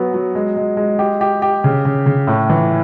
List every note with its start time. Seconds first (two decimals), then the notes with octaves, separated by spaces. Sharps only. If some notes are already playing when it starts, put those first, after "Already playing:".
Already playing: F#3 B3
0.14 F#3
0.35 G#3
0.57 G#3
0.77 G#3
0.99 G4
1.21 G4
1.42 G4
1.64 C#3
1.85 C#3
2.06 C#3
2.27 A2
2.50 E3